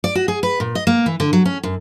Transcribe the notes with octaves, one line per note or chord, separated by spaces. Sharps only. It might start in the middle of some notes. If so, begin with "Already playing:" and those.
D5
F#4
G#4
B4
A#2
D#5
A#3
E3
D3
F#3
C#4
F#2